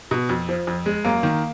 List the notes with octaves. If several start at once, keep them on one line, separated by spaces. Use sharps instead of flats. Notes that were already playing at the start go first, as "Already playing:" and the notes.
B2
F2
F3
F2
G#3
F#2 A#3
D#3